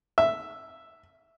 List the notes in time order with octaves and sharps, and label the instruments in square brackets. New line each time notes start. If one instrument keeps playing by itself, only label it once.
[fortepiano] E5